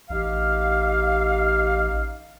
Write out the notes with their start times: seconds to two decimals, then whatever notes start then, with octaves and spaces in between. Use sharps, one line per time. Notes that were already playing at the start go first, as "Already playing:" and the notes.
0.10 A1 D#4 G4 F5